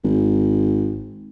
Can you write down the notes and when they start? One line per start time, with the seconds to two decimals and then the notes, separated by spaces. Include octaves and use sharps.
0.04 G#1